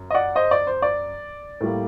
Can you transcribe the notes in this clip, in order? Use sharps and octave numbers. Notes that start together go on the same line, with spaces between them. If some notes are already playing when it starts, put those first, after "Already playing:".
Already playing: F#2
D#5
D5 F#5
C5 D#5
D5
C5
D5
A2 G3 A#3